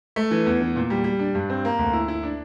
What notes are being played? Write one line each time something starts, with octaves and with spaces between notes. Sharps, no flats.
A3
E3
E2
E3
A#2
G3
G3
D4
G2
C4
A#3
D2
E4
E4
D4